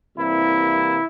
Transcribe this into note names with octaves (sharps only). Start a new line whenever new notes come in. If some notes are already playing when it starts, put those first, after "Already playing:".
C2 C3 E3 A#3 E4